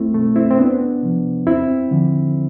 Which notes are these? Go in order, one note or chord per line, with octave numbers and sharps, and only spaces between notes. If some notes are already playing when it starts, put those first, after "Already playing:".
Already playing: C2 A3 C4 E4
B2 A3
C4 E4
C4
E2 B3 D4
C3 F3
E2 C4 E4
D3 F3